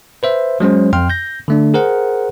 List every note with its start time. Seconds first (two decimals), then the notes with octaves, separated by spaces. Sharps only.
0.23 B4 C5 E5
0.60 F#3 G#3 C#4 C5
0.93 F2 G5 C6 F6
1.10 G6 A#6
1.48 D3 A3 D4
1.74 G#4 A#4 C5 F#5